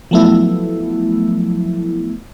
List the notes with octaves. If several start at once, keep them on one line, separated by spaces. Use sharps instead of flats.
F3 F#3 A3 B3 E4